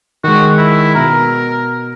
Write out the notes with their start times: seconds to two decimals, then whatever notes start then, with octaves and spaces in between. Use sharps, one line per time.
0.24 D#3 G#3 F#4
0.58 E4
0.95 B2 A#4 A#5